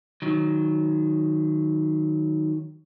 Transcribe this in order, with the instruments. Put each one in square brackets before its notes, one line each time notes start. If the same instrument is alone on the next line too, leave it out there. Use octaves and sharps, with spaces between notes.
[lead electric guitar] D#3 F#3